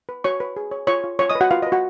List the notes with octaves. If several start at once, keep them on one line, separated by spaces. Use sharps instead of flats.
B4
F#4 C#5 C#6
B4
G#4
C#5
F4 C#5 C#6
F4
F4 C#5 C#6
D#5 D#6
B4
F#4 F#5
F4 B4 F5
D#5
B4
F#4 F#5